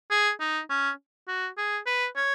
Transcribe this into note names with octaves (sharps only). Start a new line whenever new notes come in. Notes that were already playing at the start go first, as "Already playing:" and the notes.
G#4
D#4
C#4
F#4
G#4
B4
C#5